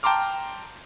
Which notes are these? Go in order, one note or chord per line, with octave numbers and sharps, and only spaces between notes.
G5 A5 A#5 C6 D6 F6